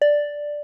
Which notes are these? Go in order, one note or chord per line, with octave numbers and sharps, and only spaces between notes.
D5